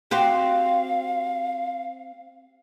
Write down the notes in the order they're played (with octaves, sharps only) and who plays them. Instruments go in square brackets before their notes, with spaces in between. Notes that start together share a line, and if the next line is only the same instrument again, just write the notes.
[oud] C4 F#4 G4 [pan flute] F5